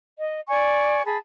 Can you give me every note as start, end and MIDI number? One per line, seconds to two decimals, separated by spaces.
0.18 0.39 75
0.48 1.02 74
0.48 1.02 80
0.48 1.02 85
1.05 1.16 68
1.05 1.16 81
1.05 1.16 83